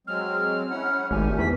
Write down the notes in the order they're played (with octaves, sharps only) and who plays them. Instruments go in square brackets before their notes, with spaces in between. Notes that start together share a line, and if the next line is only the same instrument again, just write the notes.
[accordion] F#3 G#3 C4 [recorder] F6
[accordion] C#4 E4 F#5
[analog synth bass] G#1 [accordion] G3 A3 G4 [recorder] G#5
[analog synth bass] E2 [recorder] B6